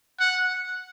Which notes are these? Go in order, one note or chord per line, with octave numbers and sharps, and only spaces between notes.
F#5